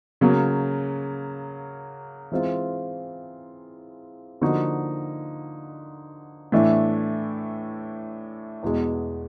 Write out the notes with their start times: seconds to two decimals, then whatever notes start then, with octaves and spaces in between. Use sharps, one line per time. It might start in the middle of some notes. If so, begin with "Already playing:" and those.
0.21 C#3 F#3 A#3
2.32 E3 G#3 C4 F4
4.41 D3 F3 A#3 D#4 F#4
6.52 A2 E3 A3 D4
8.63 E2 B2 G#3